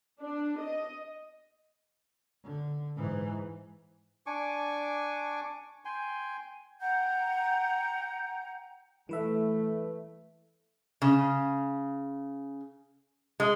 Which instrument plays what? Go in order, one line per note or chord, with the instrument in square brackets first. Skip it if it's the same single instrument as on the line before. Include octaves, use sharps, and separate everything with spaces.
[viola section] D4
D#5
[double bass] D3
G#2 E3
[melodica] D4 G#5 C#6 D6
G5 G#5 C6
[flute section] F#5 G5 A#5 G6
[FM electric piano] E3 B4 E5 [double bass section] A3
[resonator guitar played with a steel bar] C#3
G#3